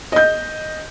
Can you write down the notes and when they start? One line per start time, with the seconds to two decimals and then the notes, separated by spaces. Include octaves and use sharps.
0.12 D#5 G6